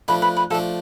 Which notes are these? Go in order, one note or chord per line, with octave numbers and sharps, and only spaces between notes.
F3 A3 D4 B4
B4
B4
F3 A3 D4 A4